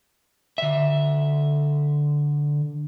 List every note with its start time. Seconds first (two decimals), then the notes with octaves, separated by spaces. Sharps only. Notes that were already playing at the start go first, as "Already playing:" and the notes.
0.58 D3 E5